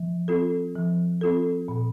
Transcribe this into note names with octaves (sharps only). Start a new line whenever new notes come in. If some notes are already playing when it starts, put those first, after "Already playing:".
Already playing: F3
C4 F4 A4
F3
C4 F4 A4
A#2